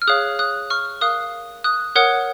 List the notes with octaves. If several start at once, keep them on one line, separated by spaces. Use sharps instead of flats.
F6
G#4 C#5 F5 D#6 F#6
D#6 F#6
C#6 F6
A#4 F5 D#6 F#6
D#6 F#6
A#4 C#5 F#5 D#6 F#6